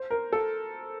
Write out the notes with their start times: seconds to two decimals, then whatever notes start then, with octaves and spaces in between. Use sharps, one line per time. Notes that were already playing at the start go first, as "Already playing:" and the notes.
Already playing: C5
0.10 A#4
0.33 A4